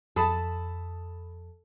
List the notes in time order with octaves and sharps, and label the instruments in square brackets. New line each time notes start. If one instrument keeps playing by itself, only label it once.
[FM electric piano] F2 [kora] A4 [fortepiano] A5 B5 D#6